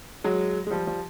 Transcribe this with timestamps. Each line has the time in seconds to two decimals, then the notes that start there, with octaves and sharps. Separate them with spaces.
0.24 F#3 G#3
0.67 G#3
0.71 F3 G3
0.87 F3 G3